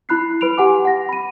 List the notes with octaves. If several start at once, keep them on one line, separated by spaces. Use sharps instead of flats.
E4 B5 F#6 C7
B4 B5 D7 F7
G4 F#5 G#5 D6
F#5 A#6
B5 D#7